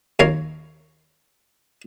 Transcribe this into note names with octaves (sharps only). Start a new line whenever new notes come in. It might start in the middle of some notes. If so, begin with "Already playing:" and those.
D#2 A#4 C#5 F5